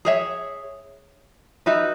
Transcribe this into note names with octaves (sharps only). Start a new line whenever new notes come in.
G#4 C#5 E5
D#4 F#4 B4 E5